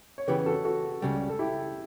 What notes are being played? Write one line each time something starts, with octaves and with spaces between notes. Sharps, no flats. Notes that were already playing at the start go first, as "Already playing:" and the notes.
C#5
C#3 E3 B3 G4 B4
F#4 A4
F#4 A4
C#2 C#3 G3
A4
E4 G4